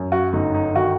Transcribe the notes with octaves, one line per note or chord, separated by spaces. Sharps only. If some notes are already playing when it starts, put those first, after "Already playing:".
Already playing: F#2
F#4
G1 D#4
D#4
D#3 F#4